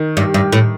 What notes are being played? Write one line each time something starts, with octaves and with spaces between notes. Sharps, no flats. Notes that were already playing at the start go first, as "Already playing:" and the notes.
Already playing: D#3
G2
G2
A2